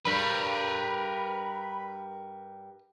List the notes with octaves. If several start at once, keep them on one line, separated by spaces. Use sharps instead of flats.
G2 G3 A#4 B4 B5